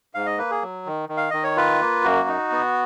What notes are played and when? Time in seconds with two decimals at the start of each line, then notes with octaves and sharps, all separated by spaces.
0.15 G#2 F5
0.26 D#5
0.38 A#3 B4
0.51 G#4
0.62 F#3
0.86 D#3
1.09 D#3
1.17 F5
1.30 D#3 D#5
1.44 C#5
1.57 F4 B4
1.81 A#3
2.04 F#2 F#4
2.28 D#4
2.52 B3